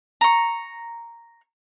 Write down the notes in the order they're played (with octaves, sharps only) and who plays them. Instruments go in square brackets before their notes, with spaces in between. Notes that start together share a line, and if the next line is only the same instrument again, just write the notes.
[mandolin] A#5 C#6